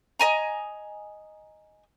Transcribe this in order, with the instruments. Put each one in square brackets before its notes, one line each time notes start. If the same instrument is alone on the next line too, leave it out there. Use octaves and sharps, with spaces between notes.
[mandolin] D#5 G#5 A#5